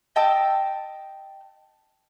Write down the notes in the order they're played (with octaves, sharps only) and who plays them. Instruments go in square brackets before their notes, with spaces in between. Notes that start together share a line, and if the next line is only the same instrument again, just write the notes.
[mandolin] D#5 G5 A5 E6